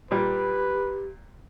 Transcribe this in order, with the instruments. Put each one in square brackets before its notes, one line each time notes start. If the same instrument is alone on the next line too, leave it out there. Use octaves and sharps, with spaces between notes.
[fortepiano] A#2 G3 [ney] G4 [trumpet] B4